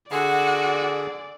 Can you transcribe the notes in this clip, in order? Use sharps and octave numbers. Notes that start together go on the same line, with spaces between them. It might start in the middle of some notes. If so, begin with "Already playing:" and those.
D3 F#4 G#4 D5 F#5